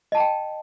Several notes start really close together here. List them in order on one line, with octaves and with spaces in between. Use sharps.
D#5 A5 A#5 G5